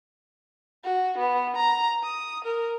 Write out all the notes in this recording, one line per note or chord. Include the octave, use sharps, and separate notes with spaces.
F#4
B3
A#5
D#6
A#4